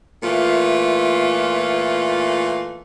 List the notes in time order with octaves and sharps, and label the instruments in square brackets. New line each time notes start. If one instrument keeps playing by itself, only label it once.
[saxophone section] A#2 E3 A3 F4